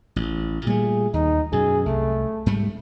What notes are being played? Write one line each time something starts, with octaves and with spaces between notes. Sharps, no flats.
A1
A#2 G3 A3 G#4
D#2 D#4
F#2 B2 G#4
C2 A3
G#2 G3 A3